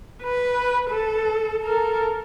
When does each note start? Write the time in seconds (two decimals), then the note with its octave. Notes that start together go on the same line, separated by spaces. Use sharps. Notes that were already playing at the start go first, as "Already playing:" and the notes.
0.22 B4
0.90 A4
1.63 A4 A#4